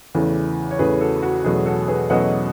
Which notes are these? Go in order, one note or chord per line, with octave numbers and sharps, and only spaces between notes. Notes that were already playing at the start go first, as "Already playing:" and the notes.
E2 C#3 E3 A3
C#5
E2 C#3 E3 A3 G#4 B4
F#4 A4
F#4
E2 B2 F#3 A3 C#4 G#4
F#4 A4
G#4 B4
E2 B2 F#3 A3 C#4 D#5 F#5